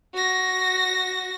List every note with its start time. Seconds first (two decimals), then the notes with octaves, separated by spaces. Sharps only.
0.14 F#4 A#6